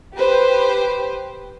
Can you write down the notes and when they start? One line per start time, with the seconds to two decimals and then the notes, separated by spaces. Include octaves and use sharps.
0.15 G4 B4 C5